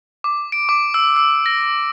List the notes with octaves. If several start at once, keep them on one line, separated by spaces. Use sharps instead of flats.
D6
D7
D6
E6
E6
A#6